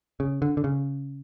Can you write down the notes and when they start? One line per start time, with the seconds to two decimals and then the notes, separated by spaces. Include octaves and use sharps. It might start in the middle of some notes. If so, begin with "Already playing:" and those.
0.20 C#3
0.42 D3
0.57 D3
0.64 C#3